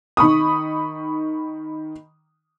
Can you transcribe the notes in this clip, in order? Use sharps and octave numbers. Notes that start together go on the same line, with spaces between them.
D#3 B5 C#6 D#6